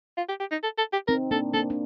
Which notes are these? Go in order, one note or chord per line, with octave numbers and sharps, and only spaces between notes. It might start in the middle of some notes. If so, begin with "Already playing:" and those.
F4
G4
G4
D#4
A4
A4
G4
C4 D#4 A#4
A#3 D4 A4
A#3 D4 A4
D4